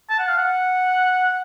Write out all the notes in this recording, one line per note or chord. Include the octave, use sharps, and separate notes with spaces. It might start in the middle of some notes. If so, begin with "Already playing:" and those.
A5
F#5
F5
F#5